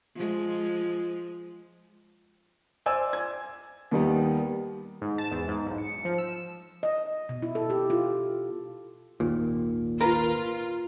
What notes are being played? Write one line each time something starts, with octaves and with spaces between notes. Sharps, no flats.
F3 G#3
C5 D5 G#5 E6
G#6
D#2 D#3 G3 B3
G#2
A5
E2
G#2
B1
C#7
F3
E6
D#5
B2
E4
A4
G4
F4
G#1 D#2 A#2
F4 A#4 B4